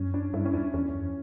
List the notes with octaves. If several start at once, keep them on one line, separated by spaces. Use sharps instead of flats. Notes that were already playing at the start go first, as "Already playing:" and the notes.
Already playing: F#2 C#4
D4
G2 E4
C#4
E2 D4
E2 C#4
F#2